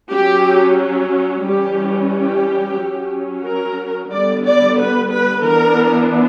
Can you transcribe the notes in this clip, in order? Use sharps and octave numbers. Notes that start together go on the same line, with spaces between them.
F#3 C#4 G4
E3 G3 C#4 G4
G4
F#3 C#4
A#4
D3 G3 B3 D5
D5
B4
B4
E3 B3 D4 A#4